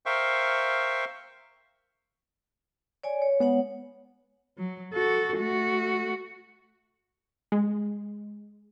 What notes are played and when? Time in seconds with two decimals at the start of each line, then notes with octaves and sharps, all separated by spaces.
0.06 A#4 C5 E5 F5 G5 C#6
3.04 C#5 D5 G#5
3.22 C#5
3.40 G#3 B3 C#5 F#5
4.58 F#3
4.94 F#4 A4
5.38 A3 F#4
7.52 G#3